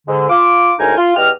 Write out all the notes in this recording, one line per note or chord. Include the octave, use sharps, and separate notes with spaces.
G#2 D3
F4 D6
D2 A2 G#3 D#4 A#4 G#5
F4
E2 G4 D#5 F6